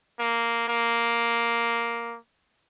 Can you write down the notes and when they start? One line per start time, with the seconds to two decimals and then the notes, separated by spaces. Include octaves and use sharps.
0.19 A#3
0.68 A#3